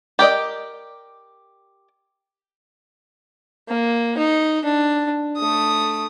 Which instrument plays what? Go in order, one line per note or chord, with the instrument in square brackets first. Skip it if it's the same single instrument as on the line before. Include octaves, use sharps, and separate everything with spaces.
[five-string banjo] G4 A#4 D5 D#5
[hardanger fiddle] A#3
D#4
D4
A3 D#6